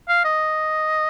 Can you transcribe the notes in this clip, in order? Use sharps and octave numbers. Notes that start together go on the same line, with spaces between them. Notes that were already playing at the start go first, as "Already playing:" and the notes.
F5
D#5